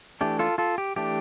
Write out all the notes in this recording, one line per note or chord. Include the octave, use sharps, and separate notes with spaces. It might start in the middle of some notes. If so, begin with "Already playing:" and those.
E3 A3 D4 G4
F4 A4
F4 A4
G4
E3 A3 D4 G4